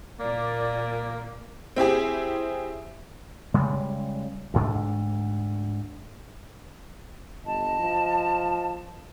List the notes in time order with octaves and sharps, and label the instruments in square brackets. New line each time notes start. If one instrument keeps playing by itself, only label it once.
[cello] A#2 [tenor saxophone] A#3 [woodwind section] D5
[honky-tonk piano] C4 E4 G4 G#4
[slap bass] C#3 G3 G#3
D2 G#2 D4
[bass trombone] G1 [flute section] D#5 A5
[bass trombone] F3